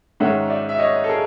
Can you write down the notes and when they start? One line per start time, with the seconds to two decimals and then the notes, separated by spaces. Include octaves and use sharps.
0.20 G#2 D#3 G#3 C#4 E5 F#5
0.50 D5 E5
0.69 E5
0.79 C#5 D#5
1.04 A4
1.09 G#4 A#4